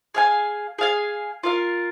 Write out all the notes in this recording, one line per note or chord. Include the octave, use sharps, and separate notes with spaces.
G#4 F5 G#5
G#4 F5 G#5
F4 A#4 F5